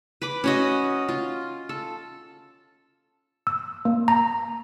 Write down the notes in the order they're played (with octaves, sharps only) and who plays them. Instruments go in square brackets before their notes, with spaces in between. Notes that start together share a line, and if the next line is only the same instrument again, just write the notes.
[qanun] B4 B5 D6
C#4 F#4 D#5
F4
A4
[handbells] E6
A#3
A#5